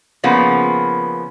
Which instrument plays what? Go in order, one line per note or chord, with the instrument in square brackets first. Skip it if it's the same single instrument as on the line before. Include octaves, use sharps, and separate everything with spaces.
[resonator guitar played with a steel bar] C#3 F3 A#3 B3